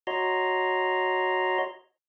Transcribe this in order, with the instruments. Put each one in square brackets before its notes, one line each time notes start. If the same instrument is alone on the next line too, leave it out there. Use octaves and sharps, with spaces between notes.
[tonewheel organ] F#4 C#5 D#5 A#5 C6